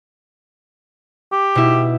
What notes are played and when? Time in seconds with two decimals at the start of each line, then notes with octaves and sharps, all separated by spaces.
1.32 G4
1.55 B2 E4